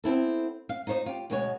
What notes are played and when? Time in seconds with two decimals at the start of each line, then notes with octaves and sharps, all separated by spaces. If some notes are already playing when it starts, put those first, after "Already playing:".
0.04 B3 C4 E4 A4
0.69 F5
0.87 D#4 F4 C5 C#5 D#5
1.06 F4 G4
1.30 D2 B2 G#3 B3 C#5